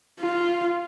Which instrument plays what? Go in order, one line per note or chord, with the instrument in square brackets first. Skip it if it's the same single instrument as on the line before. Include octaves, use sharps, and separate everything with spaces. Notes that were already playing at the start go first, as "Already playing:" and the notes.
[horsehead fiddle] F4